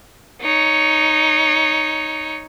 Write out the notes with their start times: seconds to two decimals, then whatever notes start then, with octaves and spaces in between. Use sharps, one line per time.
0.41 D#4 C#5